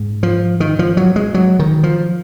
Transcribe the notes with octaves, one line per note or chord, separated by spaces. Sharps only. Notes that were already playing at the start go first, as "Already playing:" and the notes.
Already playing: G#2
F3
D#3
F3
F#3
G#3
F#3
D#3
F3